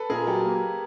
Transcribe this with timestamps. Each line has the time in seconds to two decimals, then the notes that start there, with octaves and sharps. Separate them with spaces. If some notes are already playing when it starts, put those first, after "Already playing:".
Already playing: A4 B4
0.09 A#2 G#4 A#4
0.27 F#3 G4 A4
0.45 A#3